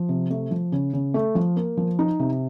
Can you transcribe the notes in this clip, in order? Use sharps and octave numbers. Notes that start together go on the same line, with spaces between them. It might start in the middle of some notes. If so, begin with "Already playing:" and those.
Already playing: F3
C3
A3
F3
C#3
C#3
A3
F3
A#3
F3
D#4
C3